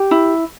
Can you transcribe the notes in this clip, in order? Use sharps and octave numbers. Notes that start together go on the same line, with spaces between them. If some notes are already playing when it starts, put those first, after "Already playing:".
Already playing: G4
E4